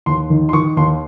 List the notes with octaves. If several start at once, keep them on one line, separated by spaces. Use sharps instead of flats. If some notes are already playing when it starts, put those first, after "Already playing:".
D#2 C6
D#3
C6
D#3 C#6
D#2 C6